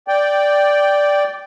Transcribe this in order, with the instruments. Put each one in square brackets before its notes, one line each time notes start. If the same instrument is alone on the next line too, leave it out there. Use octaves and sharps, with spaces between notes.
[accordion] D5 G5